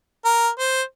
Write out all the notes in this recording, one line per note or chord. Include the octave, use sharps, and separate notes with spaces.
A#4
C5